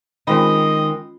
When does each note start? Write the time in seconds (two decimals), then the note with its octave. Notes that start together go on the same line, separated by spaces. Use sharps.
0.27 D#3 G#3 C4 C#4 F4 D#5 G5 B5